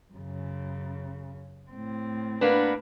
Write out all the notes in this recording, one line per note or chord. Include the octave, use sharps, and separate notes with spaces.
F#2 C#3
A2 C4
A#3 B3 D4 B4